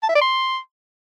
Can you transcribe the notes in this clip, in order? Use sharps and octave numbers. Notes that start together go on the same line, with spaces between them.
A5
E5
D5
C6